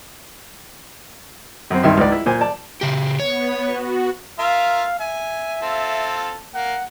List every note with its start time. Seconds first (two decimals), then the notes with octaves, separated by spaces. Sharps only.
1.71 F#2 C4
1.83 C2 G2 D#3 E5 C6
1.97 C#2 G#2 B4 D5
2.12 E4
2.26 A#2 C5 G#5
2.41 D5 A5
2.81 C#3 G4
3.20 B3 C#5
3.65 F#4
4.39 F4 A#4 E5 F5
5.00 E5 G#5
5.62 C4 F4 A4
6.54 A#3 F#5